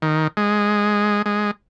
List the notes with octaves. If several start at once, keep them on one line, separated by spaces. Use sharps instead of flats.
D#3
G#3
G#3